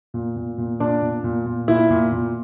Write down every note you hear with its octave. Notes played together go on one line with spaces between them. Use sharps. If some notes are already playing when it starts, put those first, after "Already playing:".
A#2
A#2
A#2
A#2 D4 D5
A#2
A#2
A#2
A#2 E4 E5
A#2
A#2